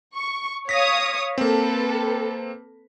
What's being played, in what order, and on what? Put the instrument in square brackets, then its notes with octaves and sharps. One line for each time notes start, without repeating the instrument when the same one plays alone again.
[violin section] C#6
[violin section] C#5 F5 D#6 [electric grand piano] A#6 B6
[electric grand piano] A#3 C4 [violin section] A4 B4